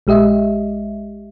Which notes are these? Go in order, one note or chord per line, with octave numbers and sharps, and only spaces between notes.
A#1 G#3 G4 D#5 E5